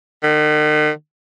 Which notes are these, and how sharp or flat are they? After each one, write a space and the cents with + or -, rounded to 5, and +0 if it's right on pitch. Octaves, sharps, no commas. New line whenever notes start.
D#3 -40